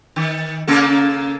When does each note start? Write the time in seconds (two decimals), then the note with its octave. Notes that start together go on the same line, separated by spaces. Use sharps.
0.16 D#3
0.67 C#3 A#3 A4